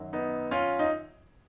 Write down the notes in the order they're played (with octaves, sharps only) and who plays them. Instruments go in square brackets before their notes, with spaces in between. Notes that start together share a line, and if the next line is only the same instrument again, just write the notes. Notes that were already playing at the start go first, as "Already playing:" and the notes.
Already playing: [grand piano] F#2 D#3 F#3
B3 D#4
C#4 F4
D#4